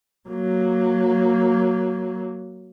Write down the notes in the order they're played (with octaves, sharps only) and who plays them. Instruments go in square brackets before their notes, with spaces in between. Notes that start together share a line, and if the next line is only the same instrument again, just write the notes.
[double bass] F#3 A#3